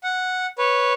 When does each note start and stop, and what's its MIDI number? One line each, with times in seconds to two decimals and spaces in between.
0.03 0.46 78
0.58 0.93 71
0.58 0.93 73